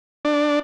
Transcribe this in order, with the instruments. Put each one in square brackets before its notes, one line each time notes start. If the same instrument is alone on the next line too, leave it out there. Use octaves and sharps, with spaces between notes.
[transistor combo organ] D4